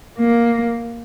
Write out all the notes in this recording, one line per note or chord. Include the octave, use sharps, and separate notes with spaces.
A#3